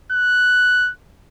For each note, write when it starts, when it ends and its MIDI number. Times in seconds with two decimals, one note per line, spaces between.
0.12 0.90 90